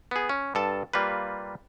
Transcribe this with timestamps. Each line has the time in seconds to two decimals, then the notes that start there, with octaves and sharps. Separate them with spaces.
0.11 B3 G#4
0.29 C#4
0.55 G2 A4 A5
0.93 G3 A#3 F4 B4